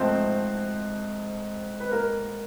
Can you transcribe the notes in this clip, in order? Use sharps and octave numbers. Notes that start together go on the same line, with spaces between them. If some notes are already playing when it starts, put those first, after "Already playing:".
Already playing: G#2 F3 A3 C4 C5
B4
A#3 A#4